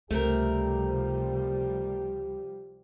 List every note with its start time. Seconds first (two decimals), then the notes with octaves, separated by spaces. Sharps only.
0.11 C#2 C3 F3 G3 A3 C4 G4 A#4